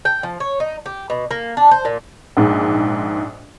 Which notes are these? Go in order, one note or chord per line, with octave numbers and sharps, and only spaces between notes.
G5
F3
C#5
D#4
G4
B2
A#3
D4
C5
A#2
A#1 G#2